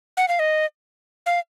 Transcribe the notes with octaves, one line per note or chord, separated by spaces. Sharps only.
F#5
F5
D#5
F5